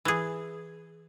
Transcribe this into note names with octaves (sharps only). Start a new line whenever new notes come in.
E3 G#4